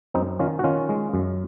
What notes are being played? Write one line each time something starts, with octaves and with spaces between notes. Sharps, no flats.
F#2 C4 D#4
D#3 C#4 F4
F#4
D#3 C#4 F4
G#3
F#2